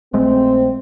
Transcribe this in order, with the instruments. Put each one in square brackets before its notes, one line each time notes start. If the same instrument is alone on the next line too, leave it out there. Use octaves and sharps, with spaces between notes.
[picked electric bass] A#1 G#3 A3 [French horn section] C4